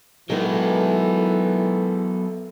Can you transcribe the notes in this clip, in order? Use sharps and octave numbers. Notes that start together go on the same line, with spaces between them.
D#3 E3 F#3 G#3 B3 A4